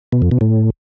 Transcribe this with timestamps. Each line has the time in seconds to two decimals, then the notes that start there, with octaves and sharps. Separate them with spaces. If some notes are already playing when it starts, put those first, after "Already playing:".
0.12 B2
0.22 F2
0.31 B2
0.41 A2